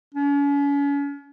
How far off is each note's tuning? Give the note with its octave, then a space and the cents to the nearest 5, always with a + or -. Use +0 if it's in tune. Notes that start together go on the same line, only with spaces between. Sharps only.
C#4 +40